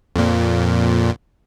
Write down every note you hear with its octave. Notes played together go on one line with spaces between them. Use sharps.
F2 A#2